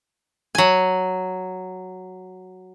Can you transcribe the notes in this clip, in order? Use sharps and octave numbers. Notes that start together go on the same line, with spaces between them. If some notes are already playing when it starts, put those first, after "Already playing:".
F#3 G#5